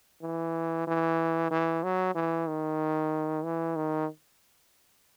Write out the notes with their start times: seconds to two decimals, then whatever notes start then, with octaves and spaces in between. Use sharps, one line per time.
0.22 E3
0.87 E3
1.51 E3
1.83 F#3
2.15 E3
2.48 D#3
3.44 E3
3.76 D#3